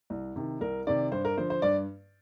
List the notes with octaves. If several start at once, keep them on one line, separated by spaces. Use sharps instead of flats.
C2
C3 D#3
C2 A#4
C3 D#3 D5
G2 C5
A#4
D3 F3 C5
C5
G2 D5